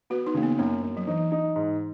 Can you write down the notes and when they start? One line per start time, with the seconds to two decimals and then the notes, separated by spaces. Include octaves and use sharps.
0.10 B3 F#4
0.27 D#4
0.34 C#3 A#3
0.43 B3
0.59 F#2 A#3
0.83 F#2
0.97 F#3
1.07 E3 D#4
1.32 D#4
1.56 G#2